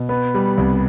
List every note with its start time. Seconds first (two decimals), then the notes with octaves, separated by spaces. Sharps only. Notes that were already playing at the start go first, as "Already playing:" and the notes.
Already playing: B2
0.09 B3
0.34 G3
0.57 C2